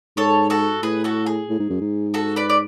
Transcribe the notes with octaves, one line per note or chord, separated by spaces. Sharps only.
G#2 A4 C#5
F#4 A4
A2 G#4 B4
F#4 A4
G#4
A2
G#2
F#2
G#2
F#4 A4
B4 D5
D5